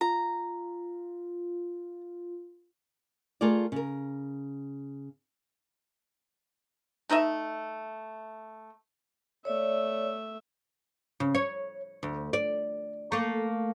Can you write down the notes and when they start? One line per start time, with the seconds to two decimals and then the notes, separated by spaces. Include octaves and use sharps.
0.01 F4 A#5
3.41 A3 F4 G#4 A#4 D5
3.72 C#3 A#4
7.09 A3 D#4 D#5 E5
9.45 A3 C#5 D5 E5
11.20 C#3
11.35 C#5
12.03 D2
12.33 D5
13.12 A3 A#3